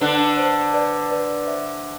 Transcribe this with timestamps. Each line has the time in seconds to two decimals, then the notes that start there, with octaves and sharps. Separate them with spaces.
0.01 D3 D4 B4
0.37 C5
0.73 B4 D5
1.10 B4 D5
1.47 C5 E5